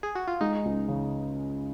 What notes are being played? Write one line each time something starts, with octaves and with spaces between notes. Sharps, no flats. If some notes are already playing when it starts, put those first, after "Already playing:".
G#4
F#4
F4
G#3 D#4
C#2
C#3